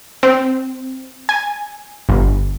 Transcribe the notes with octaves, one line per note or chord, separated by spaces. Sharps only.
C4
G#5
G1